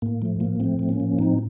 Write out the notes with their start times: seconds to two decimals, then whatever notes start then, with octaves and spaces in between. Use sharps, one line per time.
0.02 A2 A#3
0.22 F3 A3
0.40 A2 A#3
0.60 F3 A3 C4
0.79 A2
0.89 A#3 C#4
1.00 F3
1.18 A2 C4 D#4